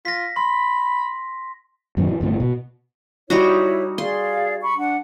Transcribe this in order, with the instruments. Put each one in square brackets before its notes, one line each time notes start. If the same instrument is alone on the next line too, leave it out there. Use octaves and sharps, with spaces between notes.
[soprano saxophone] F4 [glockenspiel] A#6 B6
[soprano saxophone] B5 [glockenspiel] C6
[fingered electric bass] F#2 A#2 D#3 C#4
E3
G1 A#2 C#3 A3
B2
[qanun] G3 D#4 F#4 [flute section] E4 C#5
[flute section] G#4 D5 F5 [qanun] C6
[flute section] B5 C#6
D4 F#5